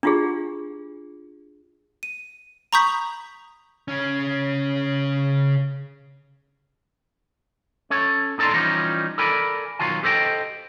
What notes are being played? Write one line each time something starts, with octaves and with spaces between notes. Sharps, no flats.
D4 E4 F4 G4 G#4
D#7
A#5 B5 C#6 D#6 G6 B6
C#3 C#4
C#4 A4 C#5
A2 D#4 A4 D5 A#5 C6
E3 F3 G3 C#4 D#4
A4 A#4 D5 G#5 B5
B1 D#3 F#3 F4 G#5
G4 A4 C5 D#5 G5